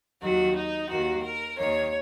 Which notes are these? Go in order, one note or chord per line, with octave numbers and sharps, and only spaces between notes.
D#2 D#3 F#3 F#4
D#4
D#2 D#3 A#3 F#4
A#4
D#2 D#3 A#3 C#5